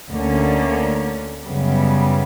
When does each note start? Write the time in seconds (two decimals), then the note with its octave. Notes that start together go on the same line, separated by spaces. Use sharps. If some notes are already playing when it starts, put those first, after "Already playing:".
0.10 D2 D3 A#3 C#4
1.44 F#2 C#3 G3 B3